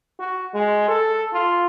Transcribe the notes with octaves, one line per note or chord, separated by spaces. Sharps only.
F#4
G#3
A4
F4